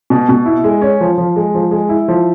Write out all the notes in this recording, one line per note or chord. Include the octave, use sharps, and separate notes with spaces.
B2
B2
E4
G#3
C#4
F3
F3
G#3
F3
G#3
E4
F3